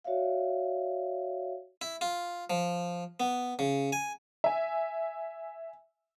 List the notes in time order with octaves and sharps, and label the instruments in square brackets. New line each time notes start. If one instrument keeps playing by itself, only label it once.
[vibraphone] F#4 C#5 D5 E5 F5
[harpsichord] E4
F4
F3
B3
C#3
G#5
[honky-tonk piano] E5 G#5